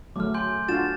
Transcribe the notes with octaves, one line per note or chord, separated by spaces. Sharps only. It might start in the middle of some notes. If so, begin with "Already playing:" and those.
F#3 A3 D6 F6
G#5 C6 G6
D4 F4 F#4 A6 E7